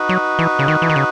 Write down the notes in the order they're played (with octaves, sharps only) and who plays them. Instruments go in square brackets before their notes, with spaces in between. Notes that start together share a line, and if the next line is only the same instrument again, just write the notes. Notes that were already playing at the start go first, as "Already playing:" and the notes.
Already playing: [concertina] D#4 F#4 B4
[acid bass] F#3
E3
C#3
D#3
E3
D#3
C#3